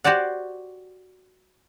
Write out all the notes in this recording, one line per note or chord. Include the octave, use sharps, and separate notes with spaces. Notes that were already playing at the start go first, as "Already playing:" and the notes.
F#4 G4 C5 D5 F#5